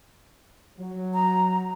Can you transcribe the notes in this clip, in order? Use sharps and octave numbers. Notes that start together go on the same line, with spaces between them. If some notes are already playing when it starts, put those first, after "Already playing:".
F#3
A#5